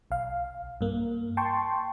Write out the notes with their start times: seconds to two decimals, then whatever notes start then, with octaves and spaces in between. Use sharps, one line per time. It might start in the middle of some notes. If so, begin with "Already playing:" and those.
0.11 B1 F5
0.81 G2 A#3
1.37 G5 A5 C6 C#6